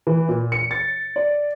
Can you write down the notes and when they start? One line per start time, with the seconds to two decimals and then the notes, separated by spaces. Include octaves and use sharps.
0.07 E3
0.28 A#2
0.52 C#7
0.71 A6
1.16 D5